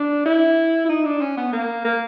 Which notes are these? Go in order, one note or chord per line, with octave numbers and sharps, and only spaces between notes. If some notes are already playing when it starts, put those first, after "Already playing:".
Already playing: D4
E4
E4
D#4
D4
C#4
B3
A#3
A#3